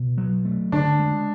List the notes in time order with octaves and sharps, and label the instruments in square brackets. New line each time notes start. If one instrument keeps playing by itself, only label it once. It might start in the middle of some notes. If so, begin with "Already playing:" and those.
Already playing: [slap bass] B2
F#3
A3
[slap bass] D3 [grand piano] D4
[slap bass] G#3